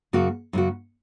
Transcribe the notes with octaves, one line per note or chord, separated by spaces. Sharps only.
F#2 C#3 A#3 F#4
F#2 C#3 A#3 F#4